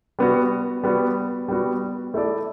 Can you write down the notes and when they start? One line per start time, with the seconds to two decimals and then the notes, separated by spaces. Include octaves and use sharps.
0.19 G3 B3 F#4
0.83 G3 B3 F#4
1.48 G3 B3 F#4
2.14 A3 E4 A4 D5